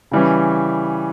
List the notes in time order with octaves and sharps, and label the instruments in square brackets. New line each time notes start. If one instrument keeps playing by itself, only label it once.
[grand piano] C#3 E3 G3 C#4